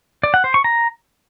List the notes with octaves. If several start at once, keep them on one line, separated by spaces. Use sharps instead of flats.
D5
F#5
C5
C#6
A#5